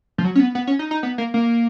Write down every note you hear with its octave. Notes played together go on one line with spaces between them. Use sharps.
F3
F#3
C#4
B3
B3
C#4
D#4
D#4
B3
A#3
A#3